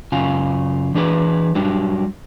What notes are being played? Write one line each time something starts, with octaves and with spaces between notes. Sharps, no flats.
F#2 C#3 F4 G#5
E3 D4 G#4 B4
F#3 G3 D4